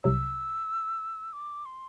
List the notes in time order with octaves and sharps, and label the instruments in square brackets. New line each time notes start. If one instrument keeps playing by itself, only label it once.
[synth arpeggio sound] C2 C3 F#3 [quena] E6
[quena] D6
C6